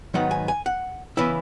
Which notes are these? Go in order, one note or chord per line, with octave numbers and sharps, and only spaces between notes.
G#2 D#3 F#3 B3 D#4 F#5
G#5
G#5
F#5
C#3 E3 B3 E4 E5